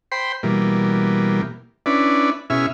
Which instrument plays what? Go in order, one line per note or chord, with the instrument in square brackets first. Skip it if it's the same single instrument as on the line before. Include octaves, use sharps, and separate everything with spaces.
[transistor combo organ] C5 G5 B5 C6
B2 E3 G3 A#3
C#4 D4 E4 B4 D5
B2 C#4 E4 G#4 E5 F6